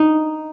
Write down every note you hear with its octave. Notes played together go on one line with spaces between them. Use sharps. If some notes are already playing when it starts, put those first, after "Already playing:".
Already playing: D#4